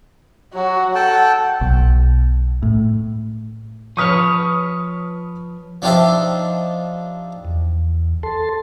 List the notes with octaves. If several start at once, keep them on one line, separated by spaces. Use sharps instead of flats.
F#3 F#4
A4 F#5 G5 A5
B1
A2
F3 B4 C#5 C#6 D#6 F6
F3 D4 D#4 G4 C5 E5
E2
A4 A5 C6